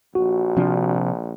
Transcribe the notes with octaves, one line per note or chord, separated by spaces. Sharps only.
A#1 F#4
C3 F3 D4